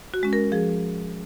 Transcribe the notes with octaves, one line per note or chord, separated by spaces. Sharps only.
F#4
G#3 C#4
A#4
F3 G#4